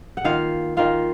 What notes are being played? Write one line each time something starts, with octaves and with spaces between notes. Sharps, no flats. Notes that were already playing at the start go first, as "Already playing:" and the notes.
F#5
D#3 A#3 F4 F5
D#3 A#3 F4 F5